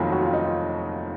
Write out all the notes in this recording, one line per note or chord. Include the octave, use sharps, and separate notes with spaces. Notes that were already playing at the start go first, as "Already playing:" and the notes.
Already playing: F1 D#2 D#3 F#3 F4
F#4
F4
D#4
F4